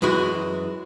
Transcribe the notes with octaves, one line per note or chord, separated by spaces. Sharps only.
F#2 E3 G#3 F#4